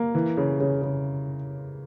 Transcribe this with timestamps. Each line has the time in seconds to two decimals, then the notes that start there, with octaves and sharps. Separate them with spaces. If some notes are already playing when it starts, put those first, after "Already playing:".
Already playing: A#3
0.15 E3
0.37 C#3
0.60 C#3
0.82 C#3